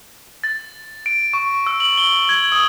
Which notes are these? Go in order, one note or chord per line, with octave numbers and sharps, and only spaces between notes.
A6
D7
C#6
E6
F#7
G7
G#6
D#6